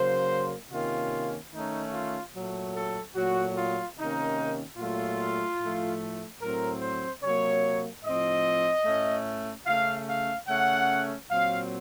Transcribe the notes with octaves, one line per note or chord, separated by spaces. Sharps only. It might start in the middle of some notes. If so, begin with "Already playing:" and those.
Already playing: C#3 F#3 A#3 C5
C3 D#3 A#3 C#4 F4
D#3 A3 C#4 D#4
F4
A#2 F#3 A3
A4
A#2 F#3 A3 F#4
F4
C3 D#3 A#3 C#4 D#4
A#2 F#3 A3 F4
A2 F3 A3
A2 F#3 C4 A#4
C5
C3 F#3 A#3 C#5
A2 F3 C4 D#5
A2 A3 C#4
C#3 A3 C#4 F5
F5
C#3 A3 C#4 F#5
A#2 F#3 C4 F5